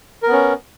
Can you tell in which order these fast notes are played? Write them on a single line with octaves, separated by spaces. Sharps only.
A#4 B3 C#4